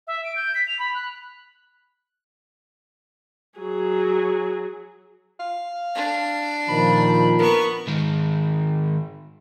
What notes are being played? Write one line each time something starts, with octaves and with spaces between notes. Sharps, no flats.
E5
D7
G6
B6
F7
B5
F#6
F#3 G#4
F5
D4
A#2 D#3 F3 B5
B3 A#4 C#6
G#2 D#3